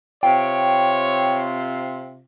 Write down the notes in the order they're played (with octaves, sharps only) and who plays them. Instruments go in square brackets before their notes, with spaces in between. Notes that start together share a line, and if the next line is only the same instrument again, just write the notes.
[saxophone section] C3 C4 F4 [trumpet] C#5 [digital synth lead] G5